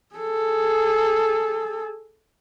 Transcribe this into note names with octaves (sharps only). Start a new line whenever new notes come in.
G#4 A4